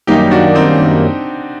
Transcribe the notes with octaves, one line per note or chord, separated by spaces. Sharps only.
F#2 D#3 G3 A#3 D#4 G4
D4 F#4
C4 D#4